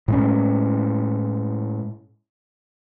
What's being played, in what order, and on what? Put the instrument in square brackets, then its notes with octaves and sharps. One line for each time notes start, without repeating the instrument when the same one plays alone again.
[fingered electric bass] A2 G#3 C#4